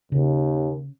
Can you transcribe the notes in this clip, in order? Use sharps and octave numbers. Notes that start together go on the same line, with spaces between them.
D#2 C#3